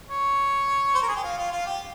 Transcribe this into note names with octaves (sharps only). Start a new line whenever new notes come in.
C#5
C5
A#4
G#4
G4
F4
F4
F4
G4